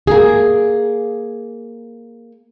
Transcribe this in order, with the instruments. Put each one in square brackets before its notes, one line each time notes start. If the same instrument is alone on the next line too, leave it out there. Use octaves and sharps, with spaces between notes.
[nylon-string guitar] A#3 G#4